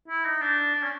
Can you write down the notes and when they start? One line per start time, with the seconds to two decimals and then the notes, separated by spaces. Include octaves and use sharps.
0.08 E4
0.25 D#4
0.41 D4
0.75 D4
0.83 C#4